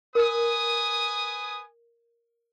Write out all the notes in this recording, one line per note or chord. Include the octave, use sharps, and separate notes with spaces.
A#4 B4 G#5 D#6